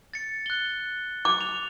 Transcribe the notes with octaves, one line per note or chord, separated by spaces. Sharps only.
A6 C#7
F#6 G7
D6
F7